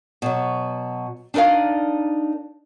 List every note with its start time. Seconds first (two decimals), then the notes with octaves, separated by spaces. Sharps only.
0.22 B2 F#3
1.34 D4 D#4 A#4 D5 F5